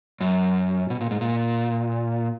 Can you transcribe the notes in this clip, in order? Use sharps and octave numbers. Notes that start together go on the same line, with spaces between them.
F#2
B2
A#2
G#2
A#2